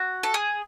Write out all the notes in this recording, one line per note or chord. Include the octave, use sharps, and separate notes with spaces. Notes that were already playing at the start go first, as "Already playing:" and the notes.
Already playing: F#4
A4
G#4